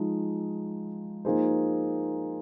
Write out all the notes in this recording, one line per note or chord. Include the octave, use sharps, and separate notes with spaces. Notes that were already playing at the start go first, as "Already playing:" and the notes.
Already playing: F3 G#3 D#4 G#4
F3 A#3 D#4 G#4 C5